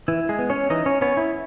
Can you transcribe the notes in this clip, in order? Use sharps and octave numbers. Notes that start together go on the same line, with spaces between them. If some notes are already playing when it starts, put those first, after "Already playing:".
E3 E4
G#3 G#4
B3
C#4 C#5
E3 D#4 D#5
C#4 C#5
B3 C#4 C#5
E4